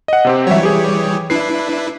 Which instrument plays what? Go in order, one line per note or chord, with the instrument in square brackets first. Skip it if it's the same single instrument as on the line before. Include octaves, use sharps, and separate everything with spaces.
[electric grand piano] D#5 F#5
C3 C4 G4
[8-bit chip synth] E3 G3 C#5 [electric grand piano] F#3 E5
[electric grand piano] G4 G#4
[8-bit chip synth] D4 E4 B4 [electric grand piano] C7